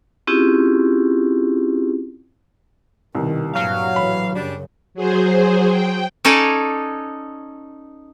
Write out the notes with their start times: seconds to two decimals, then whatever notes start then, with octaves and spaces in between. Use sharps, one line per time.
0.27 C4 C#4 E4 F4 G4 G#4
3.15 C2 B2 D#3
3.55 G2 A#2 F#3 F5
3.96 A1 E3 B5
4.36 F#2 C#3 G3 D4
4.94 F#3 G#4 C5
5.70 G5
6.25 C#4 D#4 A4 C#5 D5